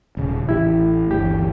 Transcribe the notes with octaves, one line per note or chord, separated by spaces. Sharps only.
D#1 C#3
A1 E4 G4
G1 D2 E3 G4